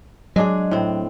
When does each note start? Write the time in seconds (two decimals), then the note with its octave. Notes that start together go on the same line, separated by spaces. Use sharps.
0.36 F#3 G#3 D4 G#4
0.71 A2 C4